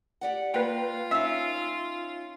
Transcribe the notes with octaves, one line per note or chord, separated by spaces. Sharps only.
G4 D5 F#5
A#3 F4 B4 G5
C#4 D#4 E5 E6